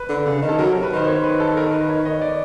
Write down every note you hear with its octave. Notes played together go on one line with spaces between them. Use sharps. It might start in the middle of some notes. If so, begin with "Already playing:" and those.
Already playing: B4
D3
C#3
D#3
A4
F#3 A#4
C3
B4
D#3 C5
D#3 C#5
B4
A4
A#4
B4
C#5
D#5
D5